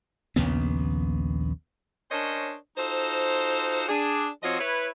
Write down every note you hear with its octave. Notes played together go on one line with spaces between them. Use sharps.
A#1 D#2 C#3 B3
C#4 D4 A#4 C5 C#5 D#5
D#4 F4 F#4 A4 C5
D4 G#4
F3 C4 F4 F#4 C#5 D#5
E4 B4 C#5